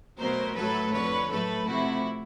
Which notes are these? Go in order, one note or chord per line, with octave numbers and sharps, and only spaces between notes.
B2 F#3 A3 A#4 C5
A2 F#3 A3 A4 B4
F2 D3 F3 B4 C#5
A2 F#3 A3 A4 B4
C3 F3 A3 E4 F#4